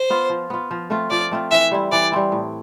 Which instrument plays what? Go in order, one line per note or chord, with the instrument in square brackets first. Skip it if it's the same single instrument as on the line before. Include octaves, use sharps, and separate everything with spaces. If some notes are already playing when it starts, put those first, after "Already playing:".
Already playing: [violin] C5
[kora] B3 F4
F3
B3 F4
F3
A3 C4 F4
[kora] F3 [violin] D5
[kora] A3 C4 F4
[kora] E3 [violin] E5
[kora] G3 C4 E4
[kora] E3 [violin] D5
[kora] G3 C4 E4
A2